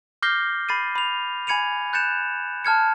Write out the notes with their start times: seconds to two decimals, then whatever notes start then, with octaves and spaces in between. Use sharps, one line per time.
0.22 D6 F6 G6 A#6 C7 G7
0.69 B5 A6 C7 D#7
0.96 B5 F7
1.47 G#5 B5 G#6 C#7 D#7 F7
1.93 F#6 G6 A6 C#7 E7
2.65 A5 F6 G#6 C#7